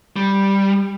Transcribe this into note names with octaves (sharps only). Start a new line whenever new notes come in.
G3